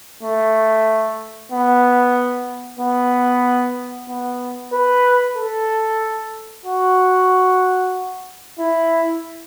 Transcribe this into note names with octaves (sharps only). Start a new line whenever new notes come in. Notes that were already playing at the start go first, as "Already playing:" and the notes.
A3
B3
B3
B3
B4
A4
F#4
E4